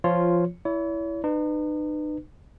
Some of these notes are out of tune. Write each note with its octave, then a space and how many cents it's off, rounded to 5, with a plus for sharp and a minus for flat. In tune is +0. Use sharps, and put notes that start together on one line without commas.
F3 -15 F4 +0 C#5 -10
E4 +0 C#5 +40
D#4 -45 B4 +15